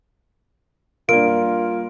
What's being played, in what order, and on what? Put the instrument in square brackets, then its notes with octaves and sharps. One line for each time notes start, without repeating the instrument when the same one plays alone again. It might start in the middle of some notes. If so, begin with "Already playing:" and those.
[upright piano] G2 A#3 [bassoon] F4 [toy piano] A#4 D5 [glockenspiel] D7